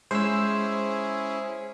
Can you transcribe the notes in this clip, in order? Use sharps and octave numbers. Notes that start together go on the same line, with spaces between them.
G#3 C#4 E4 G#4 C5 E6